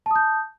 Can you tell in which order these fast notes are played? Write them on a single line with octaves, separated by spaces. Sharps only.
A5 D#6 G6